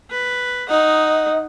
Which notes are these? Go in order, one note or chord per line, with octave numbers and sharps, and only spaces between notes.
B4
D#4 D#5 F#5